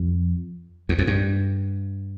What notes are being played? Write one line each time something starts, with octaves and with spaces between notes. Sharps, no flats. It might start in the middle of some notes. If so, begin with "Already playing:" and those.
Already playing: F2
E2
F2
G2